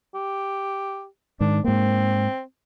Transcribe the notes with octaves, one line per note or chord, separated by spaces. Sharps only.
G4
G#2 D#3 D4
G#2 A#3 C4